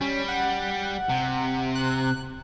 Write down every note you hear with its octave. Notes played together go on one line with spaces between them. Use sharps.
G3 C#4
F#5
C3
F#6